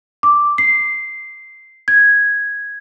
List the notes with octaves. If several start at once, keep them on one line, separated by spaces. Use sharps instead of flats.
D6
C7
G#6